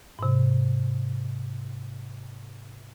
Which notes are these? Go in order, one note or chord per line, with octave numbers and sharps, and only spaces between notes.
G#2 C3